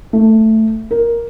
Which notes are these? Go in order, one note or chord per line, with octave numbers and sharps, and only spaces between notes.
A3
A#4